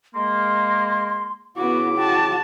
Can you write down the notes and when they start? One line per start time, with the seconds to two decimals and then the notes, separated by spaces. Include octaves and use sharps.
0.15 G#3 A#3 C6
1.56 C#3 B3 E4 F#4 D6
1.97 F#4 G5 A5